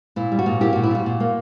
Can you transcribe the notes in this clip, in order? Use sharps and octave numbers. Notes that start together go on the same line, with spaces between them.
A#2 E4
G3
F#4
A#2
A#3 E4 G4
A#2 F#4
E4
G3 F#4
A#2
A#3